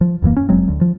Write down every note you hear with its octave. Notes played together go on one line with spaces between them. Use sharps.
F3
D#1 F#2 E3 A#3
C#4
F1 F#3 G#3 C4
D2
F3